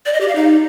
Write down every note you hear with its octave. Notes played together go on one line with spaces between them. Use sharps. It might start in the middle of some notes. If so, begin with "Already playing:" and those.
D5
D#5
G4
F5
D#4